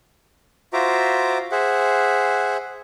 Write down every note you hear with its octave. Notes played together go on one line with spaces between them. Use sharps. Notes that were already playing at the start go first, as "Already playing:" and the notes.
F4 F#4 C5 E5 A#5 D6
G#4 C5 E5 F#5